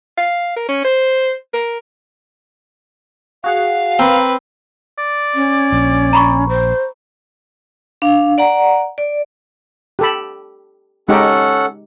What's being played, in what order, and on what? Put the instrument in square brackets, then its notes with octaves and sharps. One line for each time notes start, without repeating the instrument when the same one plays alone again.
[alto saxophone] F5
A#4
C#4
C5
A#4
[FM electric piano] F#4 G#4 F#5 [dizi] F5
[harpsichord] C4 [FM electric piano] A#4 [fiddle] B4
[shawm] D5
[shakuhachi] C#4
[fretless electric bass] A#1
[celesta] A#5 B5 C#6
[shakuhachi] C5
[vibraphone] D4 F5
D5 F#5 A#5
D5
[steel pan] G4 A4 B5
[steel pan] G#3 D#4 G4 [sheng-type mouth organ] C#4 A4 F#5